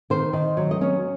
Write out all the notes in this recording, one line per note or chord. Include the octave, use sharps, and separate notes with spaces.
D#3 C5
D#3
F#3
D#5
C#4 C#5